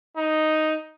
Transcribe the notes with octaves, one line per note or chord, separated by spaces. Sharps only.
D#4